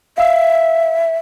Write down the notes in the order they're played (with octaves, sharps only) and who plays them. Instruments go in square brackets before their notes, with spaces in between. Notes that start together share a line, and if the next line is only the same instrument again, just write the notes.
[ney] E5 [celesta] F5 E6